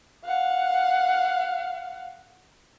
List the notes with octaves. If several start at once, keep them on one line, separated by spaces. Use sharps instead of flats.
F5 F#5